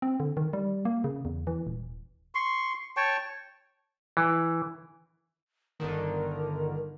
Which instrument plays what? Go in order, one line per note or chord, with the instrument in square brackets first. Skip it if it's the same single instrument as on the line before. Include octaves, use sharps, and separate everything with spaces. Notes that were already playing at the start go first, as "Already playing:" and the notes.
[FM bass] C4
D3
D#3
G3
A#3
C#3
E2
E3
D#1
[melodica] C6 C#6
C#5 G5 A5 C#6
[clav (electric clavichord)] E3
[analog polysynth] G1 D3 D#3 [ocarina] A#4